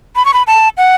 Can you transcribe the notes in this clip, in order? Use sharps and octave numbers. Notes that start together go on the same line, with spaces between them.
B5
C#6
B5
A5
F#5